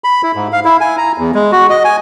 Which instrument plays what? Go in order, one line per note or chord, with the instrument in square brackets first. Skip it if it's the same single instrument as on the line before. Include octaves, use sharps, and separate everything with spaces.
[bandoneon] B5
E4
G#2
F5
E4
G#5
A#5
E2
G#3
F#4
D#5
G#5